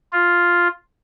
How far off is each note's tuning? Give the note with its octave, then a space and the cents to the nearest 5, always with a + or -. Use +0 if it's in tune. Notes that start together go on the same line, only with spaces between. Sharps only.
F4 +0